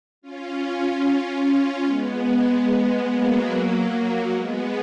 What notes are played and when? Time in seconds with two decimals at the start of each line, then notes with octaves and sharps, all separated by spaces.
0.22 C#4 F4
1.45 C#4 F4
1.85 G#3 B3
2.67 G#3 B3
3.08 F#3 A#3
4.31 G#3 B3